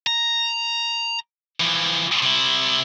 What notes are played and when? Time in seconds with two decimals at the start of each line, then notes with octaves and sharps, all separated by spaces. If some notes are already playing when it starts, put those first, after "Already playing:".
0.07 A#5
1.60 E3 F3
2.22 C3 E4